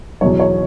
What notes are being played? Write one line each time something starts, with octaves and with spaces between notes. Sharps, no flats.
E2 B2 F#3 C#5
C#5